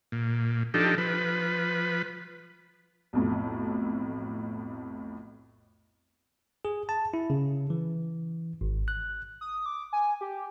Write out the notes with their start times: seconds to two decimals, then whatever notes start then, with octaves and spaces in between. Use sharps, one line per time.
0.12 A#2
0.74 F3 D4 D#4 G4 A4
0.98 F3 B4
3.13 B1 F2 A2
6.65 G#4
6.89 A5
7.14 E4
7.30 C#3
7.70 E3
8.61 G#1
8.88 F#6
9.41 D#6
9.66 D6
9.93 G#5
10.21 G4